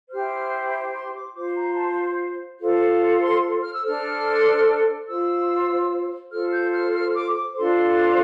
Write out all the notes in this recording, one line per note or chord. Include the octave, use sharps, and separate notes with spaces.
E4 G4 C5 F6
C6
D6
F4 C5 D6
A#5
A5
F4 A4 C5
C6
F6
E6
D4 A4 C5 F6
F4 C5 E6
F4 A4 C5 F6
G6
F6
F6
D6
D6
D4 F4 A4 C5 C6